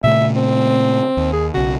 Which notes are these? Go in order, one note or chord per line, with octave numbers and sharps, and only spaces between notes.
A#2 C#3 A3 E5
C4
D#2
G#4
B1 C#3 F#4